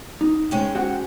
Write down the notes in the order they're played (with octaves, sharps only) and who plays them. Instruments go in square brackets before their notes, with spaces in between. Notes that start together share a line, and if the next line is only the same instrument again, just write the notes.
[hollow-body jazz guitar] D#4
[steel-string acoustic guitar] G#3 C#4 G5
[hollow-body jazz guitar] F#4 C5 F#5